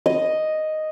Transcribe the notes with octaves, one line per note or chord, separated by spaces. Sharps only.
D#5